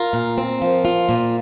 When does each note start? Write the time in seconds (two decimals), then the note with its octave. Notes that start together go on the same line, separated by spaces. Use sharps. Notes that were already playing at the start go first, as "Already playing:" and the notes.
Already playing: F4 A#4
0.13 A#2
0.38 C4
0.62 F3
0.85 F4
1.09 A#2